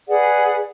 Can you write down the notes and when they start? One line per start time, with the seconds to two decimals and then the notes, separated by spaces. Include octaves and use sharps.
0.08 G#4 B4 D5 F#5